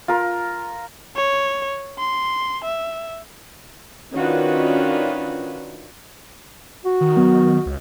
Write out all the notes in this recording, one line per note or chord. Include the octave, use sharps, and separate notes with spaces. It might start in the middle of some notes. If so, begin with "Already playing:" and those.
F4 A#4
C#5
C6
E5
D#3 C#4 D4 F4 F#4 B4
F#4
D#3
F#3 B3
C#2